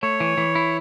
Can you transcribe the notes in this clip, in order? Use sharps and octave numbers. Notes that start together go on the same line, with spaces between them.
A3 C#5
E3
E3
E4